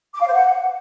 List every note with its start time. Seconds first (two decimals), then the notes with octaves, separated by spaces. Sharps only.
0.14 D6
0.20 F5
0.27 C5
0.33 F#5